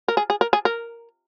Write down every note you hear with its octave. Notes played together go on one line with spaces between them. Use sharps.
A#4
G#4
G#4
A#4
G#4
A#4